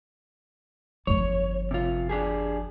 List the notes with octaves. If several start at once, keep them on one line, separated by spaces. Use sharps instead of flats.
G1 F2 C#5
C3 F4
D4 G4 G#4